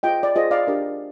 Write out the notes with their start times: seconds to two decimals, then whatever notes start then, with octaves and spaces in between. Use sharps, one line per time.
0.03 F4 G#4 C5 D#5 G5
0.23 D5
0.36 F4 G#4 C5 D#5
0.51 D5 F5
0.67 D4 G4 A#4